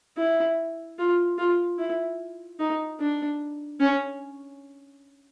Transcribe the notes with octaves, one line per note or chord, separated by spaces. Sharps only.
E4
F4
F4
E4
D#4
D4
C#4